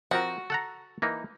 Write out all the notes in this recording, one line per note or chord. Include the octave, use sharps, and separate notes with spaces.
F3 C4 F#4 A#4
A4 F#5 A#5
E3 A#3 D#4